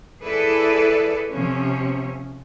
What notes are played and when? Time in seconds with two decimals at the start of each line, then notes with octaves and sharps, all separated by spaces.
0.21 E4 G#4 A4 B4 D5
1.30 C3 F3 C#4